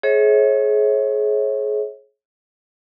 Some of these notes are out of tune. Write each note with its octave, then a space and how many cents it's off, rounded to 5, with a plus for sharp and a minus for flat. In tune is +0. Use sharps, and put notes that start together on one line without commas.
G#4 +35 C#5 -30 E5 -35